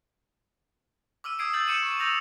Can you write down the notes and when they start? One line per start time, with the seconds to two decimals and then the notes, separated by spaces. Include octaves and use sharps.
1.24 D6 E6 F6 D#7
1.39 D#6 E6 G#6 C7 D7 D#7
1.53 E6 G6 A6 F#7
1.67 D6 G6 C#7 D#7 E7 F#7
1.83 C#6
2.00 E6 G6 A#6 F7